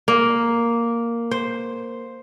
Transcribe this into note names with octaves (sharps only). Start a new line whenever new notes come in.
A#3
C5